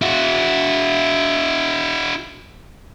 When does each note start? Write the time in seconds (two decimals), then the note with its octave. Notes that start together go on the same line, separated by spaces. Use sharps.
0.02 E4 F#4